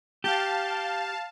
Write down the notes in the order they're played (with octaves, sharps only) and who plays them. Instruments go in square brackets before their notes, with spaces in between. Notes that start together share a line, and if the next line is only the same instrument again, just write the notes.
[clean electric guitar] G4 [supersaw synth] F5 A5